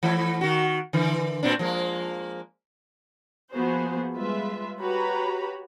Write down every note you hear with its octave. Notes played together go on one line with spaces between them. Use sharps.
E3 A3 E4
D#3 F#4
D3 E3
A#2 C4 D4
F3 G#3 A#3
F3 A#3 B3 F#4 G#4 C5
G3 G#3 F4 B4 E5
F#4 G4 B4 C#5 A#5 B5